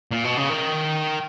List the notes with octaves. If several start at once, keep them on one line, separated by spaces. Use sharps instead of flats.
A#2
B2
C#3
D#3